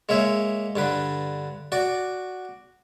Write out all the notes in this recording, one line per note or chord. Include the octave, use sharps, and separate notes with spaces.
G#3 A#3 C#5 E5
G2 D3 B4
F#4 D5